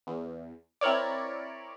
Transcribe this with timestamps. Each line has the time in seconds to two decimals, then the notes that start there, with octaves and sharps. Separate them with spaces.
0.07 E2
0.81 C4 E4 A#4 C#5 D5